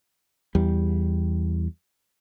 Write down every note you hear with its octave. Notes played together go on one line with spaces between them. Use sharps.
E2 G3